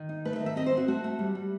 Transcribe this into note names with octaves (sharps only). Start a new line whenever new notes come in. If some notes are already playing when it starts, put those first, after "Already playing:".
Already playing: D#3
D#4
A3 B4
E5
D#3
E5
C4 D#5
C5
C4 F#4
A3 F#4
A3
G3
G3